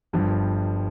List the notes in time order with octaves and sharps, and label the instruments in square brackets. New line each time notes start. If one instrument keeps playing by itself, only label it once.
[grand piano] G1 G2 F3